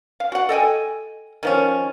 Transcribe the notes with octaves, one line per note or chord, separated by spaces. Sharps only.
F5
F#4 F#5
A4 D#5 G5 G#5
D#3 F3 C#4